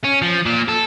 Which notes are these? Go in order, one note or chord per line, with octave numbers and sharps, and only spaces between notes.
C#4
F3
A#2
A4